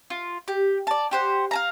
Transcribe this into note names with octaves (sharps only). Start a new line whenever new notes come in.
F4
G4
D5 A5
G4 C5 F#5
F5 A5 A#5